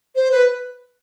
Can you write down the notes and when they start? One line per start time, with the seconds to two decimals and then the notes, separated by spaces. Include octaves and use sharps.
0.15 C5
0.31 B4